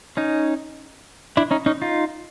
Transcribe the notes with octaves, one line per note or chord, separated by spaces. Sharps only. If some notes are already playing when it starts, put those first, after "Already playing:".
C#4 D#4
D4 E4
C#4 D#4
C#4 D#4
D#4 F4